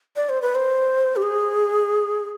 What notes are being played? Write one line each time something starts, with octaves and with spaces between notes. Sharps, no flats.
D5
C5
B4
C5
G4
G#4